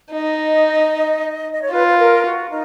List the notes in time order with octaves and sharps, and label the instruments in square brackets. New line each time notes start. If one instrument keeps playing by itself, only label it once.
[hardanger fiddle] D#4 [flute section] D#5
[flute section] D#5
C#5
[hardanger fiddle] F4 [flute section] B4
[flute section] B4
A#4
F#4
D#4